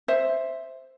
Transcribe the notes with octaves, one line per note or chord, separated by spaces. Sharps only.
C5 E5